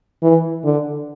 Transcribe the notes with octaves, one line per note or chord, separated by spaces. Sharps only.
E3
D3